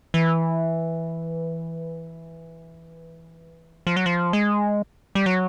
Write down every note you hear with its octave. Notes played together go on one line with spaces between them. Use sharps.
E3
F3
F#3
F3
G#3
G3
F#3